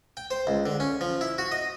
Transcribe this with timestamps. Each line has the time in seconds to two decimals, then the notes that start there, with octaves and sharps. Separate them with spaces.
0.17 G5
0.31 C5
0.47 C#2
0.66 D3
0.80 C#4
1.01 F3
1.21 E4
1.38 F#4
1.52 D#5